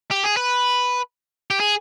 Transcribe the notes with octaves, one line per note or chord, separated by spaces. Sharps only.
G4
G#4
B4
G4
G#4